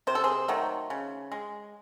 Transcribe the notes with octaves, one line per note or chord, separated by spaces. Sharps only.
C3 C5
A4
G#4 C5
D#3 F#3 A3
C#3
G#3